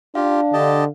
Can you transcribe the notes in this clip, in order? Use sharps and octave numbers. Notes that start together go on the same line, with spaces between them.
D4 F4 G4 F5
D3 G4 D#5 A5